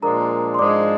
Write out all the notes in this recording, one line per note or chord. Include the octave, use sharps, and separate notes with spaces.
A#2 F3 G#3 D4 A#4 A#5
C6
G#2 F3 G#3 D4 D5 D6